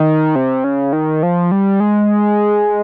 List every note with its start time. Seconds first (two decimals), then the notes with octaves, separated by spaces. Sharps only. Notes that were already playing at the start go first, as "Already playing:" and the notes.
Already playing: D#3
0.36 C3
0.64 C#3
0.93 D#3
1.23 F3
1.51 G3
1.80 G#3